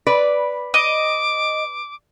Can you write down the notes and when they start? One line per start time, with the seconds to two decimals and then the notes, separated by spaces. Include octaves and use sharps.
0.07 B4 D5
0.74 D#5 D6